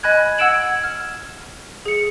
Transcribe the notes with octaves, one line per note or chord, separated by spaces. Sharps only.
D#5 G#5 B5 F#6 G#6
F#5 E6 G#6 D7 E7 F#7
F6
G#4 C#7